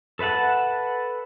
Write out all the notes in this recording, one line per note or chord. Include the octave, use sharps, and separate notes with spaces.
A4 B4 E5 F#5 A5